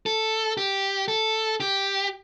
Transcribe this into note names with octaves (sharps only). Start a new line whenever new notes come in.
A4
G4
A4
G4